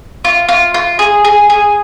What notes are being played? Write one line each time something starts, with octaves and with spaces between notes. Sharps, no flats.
F4
F4
F4
G#4
G#4
G#4